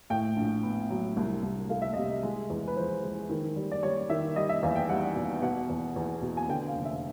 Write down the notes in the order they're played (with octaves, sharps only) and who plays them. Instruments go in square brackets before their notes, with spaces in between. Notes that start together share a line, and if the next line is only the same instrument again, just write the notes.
[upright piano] A2 G5
A#1
B3
F#3
C2
C2
A3 F5
E5
C3 D#5
E5
G#3
E2
B4
F3 C5
G#3
D#3
G3
D5
G3 C#5
D#3 E5
G3 D#5
E5
E2 F5
G5
G3 F#5
B2
B2 F#5
E2
E2
B2
G#5
D3 G5
F5
F1
E5